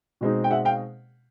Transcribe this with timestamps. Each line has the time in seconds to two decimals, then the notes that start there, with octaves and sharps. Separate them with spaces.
0.21 B2 G#3 C4 D#4
0.44 G5
0.51 E5 F#5
0.65 F5 G5